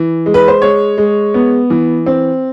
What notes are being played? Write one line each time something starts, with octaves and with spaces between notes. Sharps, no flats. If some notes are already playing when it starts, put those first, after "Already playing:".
Already playing: E3
G#3
B4
C5
G#3 C#5
G#3
B3
E3
C4